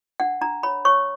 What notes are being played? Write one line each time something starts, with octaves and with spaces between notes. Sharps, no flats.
D4 F#5
D4 A#5
C#5 B5
C#5 C#6